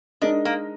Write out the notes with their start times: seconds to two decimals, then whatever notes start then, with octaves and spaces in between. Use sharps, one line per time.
0.21 G#3 D4 D#4 A#4 D#5
0.45 A#3